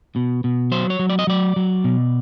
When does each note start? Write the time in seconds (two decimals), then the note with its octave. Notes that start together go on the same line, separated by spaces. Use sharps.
0.16 B2
0.44 B2
0.72 F#3 C5
0.90 C#5
0.99 F#3
1.10 D5
1.19 D#5
1.27 F#3 D5
1.56 F#3
1.84 B2